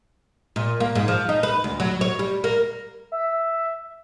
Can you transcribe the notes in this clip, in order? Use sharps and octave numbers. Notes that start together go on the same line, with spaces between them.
A#2
A#3
G#2
F3
D#4
B4
D2
F#3
C#5
G3
A#3
E5